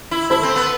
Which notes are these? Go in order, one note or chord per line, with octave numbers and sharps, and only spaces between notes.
E4
E4 A4 C5
C4
B3